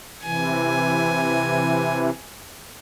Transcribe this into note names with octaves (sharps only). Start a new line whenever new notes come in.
C3 E3 G#5